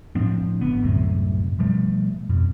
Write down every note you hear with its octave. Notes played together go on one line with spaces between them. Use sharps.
A2 F3 C4 D4
G#1 D3 B3
C2 F#2 A2 C3
B2 F3 G3 A3
F2 B2